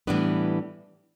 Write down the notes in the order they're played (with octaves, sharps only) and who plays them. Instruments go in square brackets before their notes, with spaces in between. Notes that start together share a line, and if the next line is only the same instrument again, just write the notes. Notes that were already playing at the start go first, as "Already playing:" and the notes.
[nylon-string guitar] A2 E3 G3 B3 D4